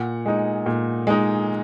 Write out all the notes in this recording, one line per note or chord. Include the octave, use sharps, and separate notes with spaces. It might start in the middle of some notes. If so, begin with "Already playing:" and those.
Already playing: A#2 F#5
G#3 D#4
A#2
G#3 D#4